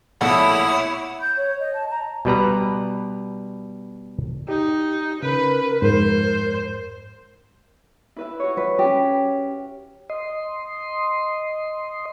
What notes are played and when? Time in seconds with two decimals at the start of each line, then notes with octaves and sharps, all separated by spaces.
0.21 A#1 B2 A3 E4 C#5 F#5 D#6
1.19 G6
1.37 C#5
1.60 D#5
1.74 A5
1.89 A#5
2.25 B2 G3 B4 A#5
4.49 D#4 G4
5.23 C#3 A#4 B4
5.82 F2 G#2 C5
8.16 E4 B4 E5
8.40 F#4 C#5
8.57 B4
8.79 C#4 G4
10.10 D#5 C6